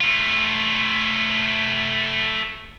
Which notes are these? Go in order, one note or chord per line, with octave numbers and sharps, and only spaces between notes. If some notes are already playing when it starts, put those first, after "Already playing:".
A3 F4